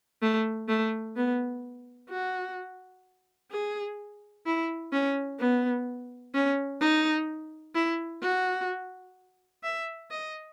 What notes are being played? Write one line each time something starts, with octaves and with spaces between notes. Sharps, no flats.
A3
A3
B3
F#4
G#4
E4
C#4
B3
C#4
D#4
E4
F#4
E5
D#5